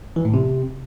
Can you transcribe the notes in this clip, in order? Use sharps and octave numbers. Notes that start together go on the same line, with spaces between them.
E3
A2
C3